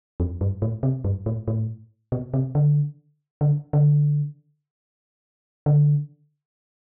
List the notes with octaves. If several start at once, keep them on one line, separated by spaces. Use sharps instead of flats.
F2
G2
A2
C3
G2
A2
A2
B2
C3
D3
D3
D3
D3